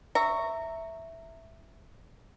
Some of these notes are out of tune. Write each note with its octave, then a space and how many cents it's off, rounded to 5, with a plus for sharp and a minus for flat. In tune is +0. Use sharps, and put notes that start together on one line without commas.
E5 +0 A#5 -20 C#6 +0